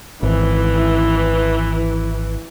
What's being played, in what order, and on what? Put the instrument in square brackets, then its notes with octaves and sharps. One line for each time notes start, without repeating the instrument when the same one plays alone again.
[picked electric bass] G#1 [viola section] E3